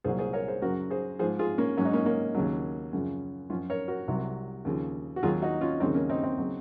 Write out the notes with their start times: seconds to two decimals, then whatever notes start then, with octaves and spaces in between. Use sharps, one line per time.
0.04 C2 A#2 F#3 G#4 C5
0.19 G#4 C5
0.33 A#4 C#5
0.48 G#4 C5
0.62 F#2 C#3 F#3 F#4 A#4
0.91 G#4 C5
1.19 G#2 F3 G#4 C5
1.39 F4 G#4
1.58 A#3 C#4
1.77 G#2 F#3 C#4
1.85 D#4
1.93 A#3 C#4
2.06 A#3 C#4
2.35 D#2 C#3 F#3
2.93 F#2 C#3 F3
3.50 F#2 F3 C#4 F4
3.70 A#4 C#5
3.88 F#4 A#4
4.08 C2 C3 F#3
4.65 D#2 C#3 F3
5.16 F#4
5.23 D#2 D#3 F#3 F4 G#4
5.42 D#4 F#4
5.61 C#4 F4
5.80 D#2 C#3 F#3 C4 D#4
5.94 A#3 C#4
6.09 C4 D#4
6.24 C4 D#4
6.38 C#3 F#3